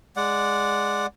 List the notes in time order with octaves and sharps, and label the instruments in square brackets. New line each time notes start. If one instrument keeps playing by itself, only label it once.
[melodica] G#3 D5 F#5